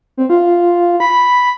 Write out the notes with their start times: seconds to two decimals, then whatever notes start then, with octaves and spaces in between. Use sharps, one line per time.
0.17 C4
0.30 F4
1.00 B5